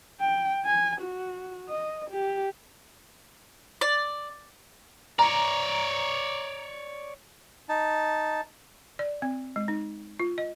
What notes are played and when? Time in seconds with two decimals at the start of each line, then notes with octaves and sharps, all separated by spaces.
0.20 G5
0.66 G#5
1.01 F#4
1.69 D#5
2.10 G4
3.81 D5
5.19 C#5 D5 A#5
7.69 D#4 A5
8.99 D5
9.22 C4
9.56 G#3
9.68 D#4
10.20 F4
10.38 D#5